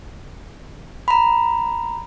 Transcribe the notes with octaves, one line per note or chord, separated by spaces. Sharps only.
A#5 B5